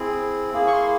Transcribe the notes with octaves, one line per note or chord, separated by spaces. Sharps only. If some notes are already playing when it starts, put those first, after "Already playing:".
Already playing: C4 E4 G#4
A#3 E4 G#4
C#6
C6